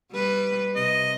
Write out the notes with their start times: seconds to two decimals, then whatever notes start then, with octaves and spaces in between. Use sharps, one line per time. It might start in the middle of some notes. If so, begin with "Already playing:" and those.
0.12 G3 B4
0.76 C3 D#5